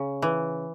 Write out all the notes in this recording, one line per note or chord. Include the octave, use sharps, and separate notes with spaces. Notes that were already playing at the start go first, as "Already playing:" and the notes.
Already playing: C#3
E3